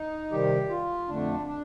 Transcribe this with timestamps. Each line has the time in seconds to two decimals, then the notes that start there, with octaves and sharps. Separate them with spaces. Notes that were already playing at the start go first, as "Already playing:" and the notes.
Already playing: D#4
0.32 C3 D#3 G3 G4
0.70 F4
1.08 F2 D3 A3 D4
1.46 D4